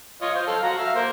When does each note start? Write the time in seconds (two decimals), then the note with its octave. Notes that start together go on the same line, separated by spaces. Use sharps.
0.22 F4 C#5 D#5
0.35 C5 F5
0.47 A4 F5
0.63 F#4 A#5
0.78 E5 F5
0.96 A#3 C5